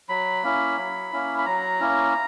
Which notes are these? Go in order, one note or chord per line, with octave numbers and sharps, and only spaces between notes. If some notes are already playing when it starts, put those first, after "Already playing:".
F#3 B5
A#3 C#4 E4
F#3
A#3 C#4 E4
B5
F#3 A#5
A#3 C#4 E4